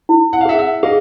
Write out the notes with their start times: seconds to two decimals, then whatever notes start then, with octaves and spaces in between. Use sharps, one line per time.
0.09 E4
0.33 F#5
0.41 F5
0.45 G#4 E5 F#5
0.58 E5 F#5
0.83 G#4 D#5 F5